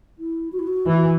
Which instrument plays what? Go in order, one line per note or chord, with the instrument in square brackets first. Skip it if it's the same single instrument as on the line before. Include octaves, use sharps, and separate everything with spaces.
[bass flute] E4
F#4
E4
F#4
[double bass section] E3 [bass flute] E4
[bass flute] F#4